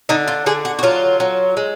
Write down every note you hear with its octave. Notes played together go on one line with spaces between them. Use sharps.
D3 D#4
F4
D3 G#4
F#4
F#4
F#3 F4
F#3
G#3